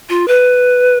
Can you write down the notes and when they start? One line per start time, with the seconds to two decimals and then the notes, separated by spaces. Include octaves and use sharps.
0.09 F4
0.28 B4